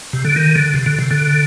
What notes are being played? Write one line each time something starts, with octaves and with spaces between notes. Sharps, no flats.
C3
D3
D#3
D3
C3
D3
C3
D3